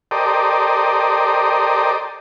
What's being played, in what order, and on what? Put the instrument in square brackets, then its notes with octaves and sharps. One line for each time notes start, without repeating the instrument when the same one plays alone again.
[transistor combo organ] G4 A4 A#4 C5 D5 D#5